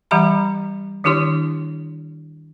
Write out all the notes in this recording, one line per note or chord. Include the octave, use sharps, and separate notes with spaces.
E3 G3 G4 E5 A#5 B5
D#3 D4 E4 G4 C#5 C6